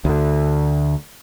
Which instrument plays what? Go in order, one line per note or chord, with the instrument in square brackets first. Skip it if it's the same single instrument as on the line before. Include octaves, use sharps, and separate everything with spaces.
[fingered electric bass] D2 D3